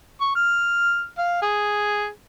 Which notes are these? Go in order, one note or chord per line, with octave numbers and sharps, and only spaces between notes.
C#6
F6
F5
G#4